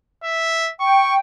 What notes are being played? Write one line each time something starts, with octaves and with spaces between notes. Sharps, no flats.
E5
G5 C#6